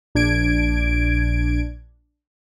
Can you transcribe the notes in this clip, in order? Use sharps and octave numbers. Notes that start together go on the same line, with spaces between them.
A#1 D4 G#6 D7